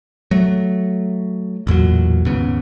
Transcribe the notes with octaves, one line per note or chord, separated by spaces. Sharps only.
F#3 A3
A1 E2 A#2 F#3
D#2 G#2 C#3 B3